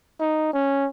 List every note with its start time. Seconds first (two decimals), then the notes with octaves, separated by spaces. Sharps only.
0.21 D#4
0.53 C#4